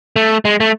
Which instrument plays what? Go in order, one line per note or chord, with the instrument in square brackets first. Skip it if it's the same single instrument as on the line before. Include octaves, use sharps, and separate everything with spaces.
[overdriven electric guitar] A3
G#3
A3